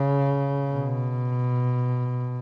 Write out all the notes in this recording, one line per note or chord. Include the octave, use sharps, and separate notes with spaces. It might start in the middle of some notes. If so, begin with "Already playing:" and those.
Already playing: C#3
B2